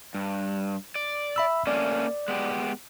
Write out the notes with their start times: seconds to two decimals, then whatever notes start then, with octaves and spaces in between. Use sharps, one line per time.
0.14 G2
0.95 D5
1.36 E5 B5 E6
1.67 A3 A#3 C#4 D5
2.28 G#3 B3 G4